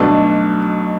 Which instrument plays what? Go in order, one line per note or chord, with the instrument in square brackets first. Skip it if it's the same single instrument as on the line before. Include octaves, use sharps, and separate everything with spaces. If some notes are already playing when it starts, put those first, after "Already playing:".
Already playing: [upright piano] B1 B2 A3 D4